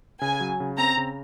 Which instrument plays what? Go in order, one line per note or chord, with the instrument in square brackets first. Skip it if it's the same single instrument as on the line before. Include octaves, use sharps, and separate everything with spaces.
[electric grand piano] C#3 [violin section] G#5
[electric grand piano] F#3
C#3
[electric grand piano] C4 [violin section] A#5
[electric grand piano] C#3